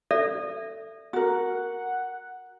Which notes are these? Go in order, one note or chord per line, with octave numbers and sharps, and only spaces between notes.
A4 D5 E5
F#4 A#4 F#5